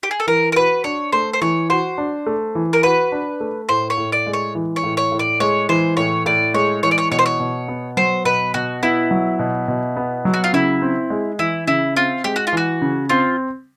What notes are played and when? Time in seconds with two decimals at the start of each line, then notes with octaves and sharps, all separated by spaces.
0.03 G4
0.11 G#4
0.20 A4
0.27 E3 A#4
0.52 A#4
0.56 F#4 B4
0.84 D4 C#5
1.12 A3 C5
1.33 C5
1.41 E3 C#5
1.70 F#4 C5
1.98 D4
2.26 A3
2.55 E3
2.73 A#4
2.83 F#4 B4
3.12 D4
3.40 A3
3.69 A2 C5
3.90 C#5
3.98 A2
4.12 D5
4.27 G#3
4.33 C#5
4.55 E3
4.76 C#5
4.83 A2
4.97 C#5
5.12 A2
5.19 D5
5.40 G#3 C#5
5.69 E3 C5
5.97 A2 C#5
6.26 A2 D5
6.54 G#3 C#5
6.83 E3 C#5
6.91 D5
6.98 C#5
7.11 B2 C#5
7.19 C5
7.26 C#5
7.40 B2
7.68 B3
7.97 F#3 C5
8.25 B2 B4
8.54 B2 F#4
8.83 B3 E4
9.11 F#3
9.39 B2
9.68 B2
9.97 B3
10.25 F#3
10.34 F#4
10.44 F4
10.53 C#3 E4
10.82 C4
11.10 G#3
11.39 E3 E4
11.67 C#3 E4
11.96 C4 F4
12.24 G#3 G4
12.36 F#4
12.47 F4
12.53 E3 F#4
12.82 C#3
13.09 C4 F4